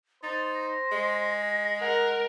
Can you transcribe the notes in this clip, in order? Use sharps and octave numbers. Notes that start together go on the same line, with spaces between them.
D#4 C5 A6
A#6
G#3
A#4 F#5